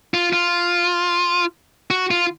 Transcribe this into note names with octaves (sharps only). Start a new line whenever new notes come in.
F4
F4
F#4
F4